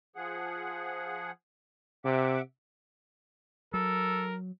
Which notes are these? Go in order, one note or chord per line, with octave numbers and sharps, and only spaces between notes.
F3 G#4 F#5
C3 E5 F#5 D6
F#3 A4 A#4